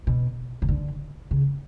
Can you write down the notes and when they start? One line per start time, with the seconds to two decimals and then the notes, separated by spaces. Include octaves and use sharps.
0.07 B2
0.62 C#3
0.68 D3
1.31 C#3